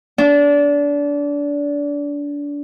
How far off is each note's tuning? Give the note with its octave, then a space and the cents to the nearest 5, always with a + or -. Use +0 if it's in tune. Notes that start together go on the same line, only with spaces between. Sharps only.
D4 -25